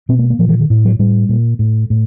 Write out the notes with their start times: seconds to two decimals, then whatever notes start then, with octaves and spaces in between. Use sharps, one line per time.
0.09 B2 C4
0.19 A#3
0.30 A#3
0.39 A#2 F3
0.49 E3
0.60 D#3
0.70 A2
0.85 F#3
0.99 A2 G3
1.29 A#2
1.59 A2
1.90 A2